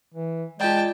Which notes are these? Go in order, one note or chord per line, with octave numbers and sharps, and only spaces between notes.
E3
G#3 F4 D5 G5 A5